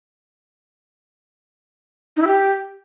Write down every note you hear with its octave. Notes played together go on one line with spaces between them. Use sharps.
D#4
E4
G4